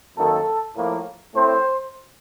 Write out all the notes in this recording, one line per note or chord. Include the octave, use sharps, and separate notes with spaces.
F#2 D#3 A#3 A4
A2 F3 A#3
A2 A3 C4 C5